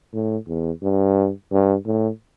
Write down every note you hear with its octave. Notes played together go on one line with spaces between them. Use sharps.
A2
E2
G2
G2
A2